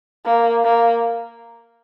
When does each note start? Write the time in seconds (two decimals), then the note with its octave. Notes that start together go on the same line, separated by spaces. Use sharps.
0.26 A#3
0.64 A#3